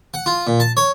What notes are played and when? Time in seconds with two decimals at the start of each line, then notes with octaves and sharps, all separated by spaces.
0.14 F#5
0.26 F4
0.47 A#2
0.60 A5
0.77 C#5